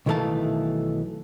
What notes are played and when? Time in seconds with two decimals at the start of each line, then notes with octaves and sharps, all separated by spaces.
0.06 B1 D#3 E3 A3 F5 A5